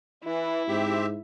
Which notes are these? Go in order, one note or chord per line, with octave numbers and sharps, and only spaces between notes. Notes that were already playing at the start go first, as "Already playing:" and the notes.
E3 E4
G#2 C4 G4 E5